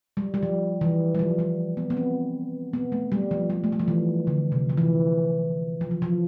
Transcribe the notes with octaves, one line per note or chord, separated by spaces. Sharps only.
G3
G3
F3
E3
G3
F3
G3
B3
B3
C4
B3
A3
G3
F3
G3
A3
G3
F3
E3
D3
C3
F3
E3
F3
E3
F3